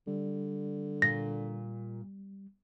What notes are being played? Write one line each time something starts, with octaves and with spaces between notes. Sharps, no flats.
D3 G3
A#2 A#6